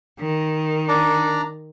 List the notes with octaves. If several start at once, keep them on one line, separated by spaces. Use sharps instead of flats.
D#3
D4 D5 A#5